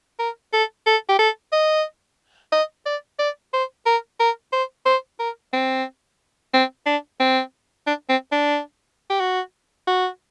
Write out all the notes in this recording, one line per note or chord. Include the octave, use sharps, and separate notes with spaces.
A#4
A4
A4
G4
A4
D#5
D#5
D5
D5
C5
A#4
A#4
C5
C5
A#4
C4
C4
D4
C4
D4
C4
D4
G4
F#4
F#4